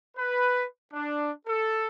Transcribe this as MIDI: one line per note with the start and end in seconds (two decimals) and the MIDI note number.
0.17 0.65 71
0.93 1.31 62
1.46 1.88 69